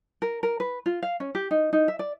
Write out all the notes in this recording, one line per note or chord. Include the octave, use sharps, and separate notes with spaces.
A#4
A#4
B4
F4
F5
C#4
G4
D#4
D#4
E5
D5